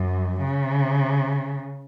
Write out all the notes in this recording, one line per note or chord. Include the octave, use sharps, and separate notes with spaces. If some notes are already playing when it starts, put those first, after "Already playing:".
Already playing: F#2
C#3